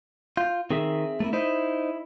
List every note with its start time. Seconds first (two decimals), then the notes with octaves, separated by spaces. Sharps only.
0.37 F4 G6
0.71 D#3 C4 G#4 E5
1.20 A3 A#3 E4
1.33 D#4 E4 C5 D#5